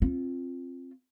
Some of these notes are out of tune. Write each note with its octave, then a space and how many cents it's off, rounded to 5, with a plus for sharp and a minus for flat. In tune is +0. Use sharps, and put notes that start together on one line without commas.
C4 +20 F4 +0